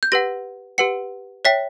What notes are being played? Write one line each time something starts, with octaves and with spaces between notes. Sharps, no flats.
G6
G4 B4 F#5 A#6
G4 B4 F#5 C#7
C#5 E5 G5 B6